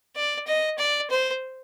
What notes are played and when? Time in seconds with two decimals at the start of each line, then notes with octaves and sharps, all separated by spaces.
0.16 D5
0.47 D#5
0.78 D5
1.10 C5